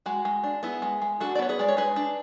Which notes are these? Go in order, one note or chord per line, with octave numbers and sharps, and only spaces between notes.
G#3 F#4
G#3
D4
B3 E4 G#4
G#3
G#3
D4 F#4 A4
D5
B3 C#5
G#4 B4
G#3 D5
C#5
G#3 G#4 B4
D4